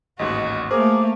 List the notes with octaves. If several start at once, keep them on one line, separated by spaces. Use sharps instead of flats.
A1 D#2 G#2 F#4 D#5
A3 A#3 G#4 A#4 C5 D6